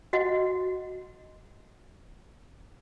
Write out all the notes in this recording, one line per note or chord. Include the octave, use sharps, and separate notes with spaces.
F#4 D#5 F#5